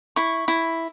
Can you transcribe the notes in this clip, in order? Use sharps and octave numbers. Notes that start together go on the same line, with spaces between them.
E4 C#6
E4